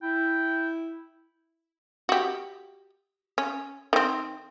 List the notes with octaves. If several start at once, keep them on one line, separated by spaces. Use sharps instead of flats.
E4 G5
F#4 G4
C#4
D#3 C4